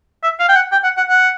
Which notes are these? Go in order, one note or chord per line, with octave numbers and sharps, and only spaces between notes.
E5
F5
G5
F#5
G5
F#5
F#5
F#5